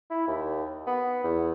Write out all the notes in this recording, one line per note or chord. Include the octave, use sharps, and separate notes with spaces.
E4
D#2
B3
E2